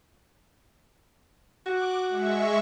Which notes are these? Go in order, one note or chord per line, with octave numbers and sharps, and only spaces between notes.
F#4 D6 F#6
G#3 E5 C#6